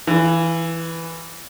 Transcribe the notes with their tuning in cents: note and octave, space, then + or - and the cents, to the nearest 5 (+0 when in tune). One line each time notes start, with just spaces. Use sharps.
E3 +0 F4 -40